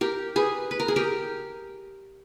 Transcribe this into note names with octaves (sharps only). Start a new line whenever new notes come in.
G4 A#4
G#4 B4
B4
A#4
G#4
G4 A#4